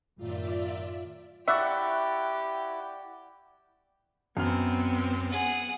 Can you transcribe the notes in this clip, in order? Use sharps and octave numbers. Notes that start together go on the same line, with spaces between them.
F#2 A2 D#3 F4 D5 E5
E4 G4 D5 E5 F#5 C#6
F#2 B3 C4 F6
G#4 F#5 D#7